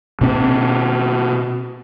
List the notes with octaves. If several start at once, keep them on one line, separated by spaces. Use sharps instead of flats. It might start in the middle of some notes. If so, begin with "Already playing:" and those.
B2 C4